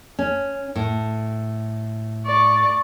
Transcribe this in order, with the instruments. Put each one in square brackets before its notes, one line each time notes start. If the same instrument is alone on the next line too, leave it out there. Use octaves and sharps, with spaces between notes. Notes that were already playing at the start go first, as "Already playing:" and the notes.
[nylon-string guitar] C#4
A2
[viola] D5 C#6